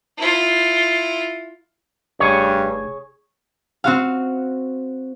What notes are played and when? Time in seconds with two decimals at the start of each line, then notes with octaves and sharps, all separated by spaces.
0.18 E4 F4
2.20 F1 G2 G#4 C#5
3.84 C4 F#4 F5